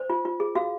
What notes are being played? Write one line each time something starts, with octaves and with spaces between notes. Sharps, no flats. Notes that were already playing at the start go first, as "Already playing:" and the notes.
Already playing: C5
F4
F4
G#4
F#4 F5